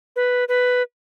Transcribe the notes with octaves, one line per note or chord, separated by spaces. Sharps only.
B4
B4